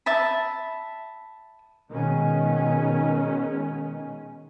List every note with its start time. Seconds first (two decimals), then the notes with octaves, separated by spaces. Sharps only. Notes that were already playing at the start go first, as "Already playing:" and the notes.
0.06 E5 A5 B5
1.90 B2 D#3 G#3 C#4